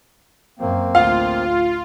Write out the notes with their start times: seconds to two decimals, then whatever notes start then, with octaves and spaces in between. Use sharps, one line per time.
0.59 F#2 A#3 C4
0.95 A1 D2 F4 F5